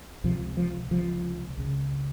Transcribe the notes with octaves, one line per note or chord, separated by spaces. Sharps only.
C#2 C3 F3
F3
C#2 C3 F3
C#2 C#3